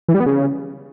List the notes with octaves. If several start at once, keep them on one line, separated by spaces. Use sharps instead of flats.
E3
G3
B3
C#3